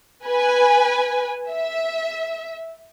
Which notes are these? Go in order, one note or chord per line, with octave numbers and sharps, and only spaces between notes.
B4 G#5
E5